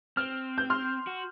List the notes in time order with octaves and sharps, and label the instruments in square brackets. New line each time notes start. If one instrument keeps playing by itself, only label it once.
[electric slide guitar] C4 [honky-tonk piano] F6
[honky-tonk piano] G6
C6 F6
[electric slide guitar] F#4